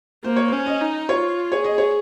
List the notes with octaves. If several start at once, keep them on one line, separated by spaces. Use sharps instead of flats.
A#3 C5
C#5
C#4 C5
D#5
D#4
F4 C#5
G#4 C#5
D#5
C#5